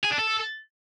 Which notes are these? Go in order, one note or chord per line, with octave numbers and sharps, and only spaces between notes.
G#4
D4
A4